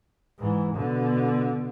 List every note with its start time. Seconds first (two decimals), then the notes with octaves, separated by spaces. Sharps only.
0.38 G#2 E3
0.75 B2 D3